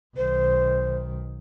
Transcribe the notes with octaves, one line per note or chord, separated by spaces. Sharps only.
B1 D#3 C5